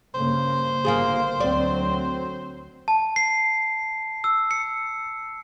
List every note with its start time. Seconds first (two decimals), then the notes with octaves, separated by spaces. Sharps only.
0.14 G2 C#3 A#3 C5
0.85 G1 A#3 F4 G#4
1.40 D2 F#3 C4 D5
2.88 A5
3.16 C7
4.24 E6
4.51 C#7